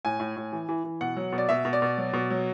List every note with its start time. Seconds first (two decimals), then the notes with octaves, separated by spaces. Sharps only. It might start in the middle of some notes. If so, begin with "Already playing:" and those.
0.05 A2 G#5
0.20 A2
0.36 A2
0.52 E3
0.69 E3
0.84 E3
1.01 B2 F#5
1.17 F#3
1.32 B2
1.38 D5
1.49 B2 E5
1.65 B2
1.73 D5
1.82 B2
1.98 F#3
2.13 B2
2.30 F#3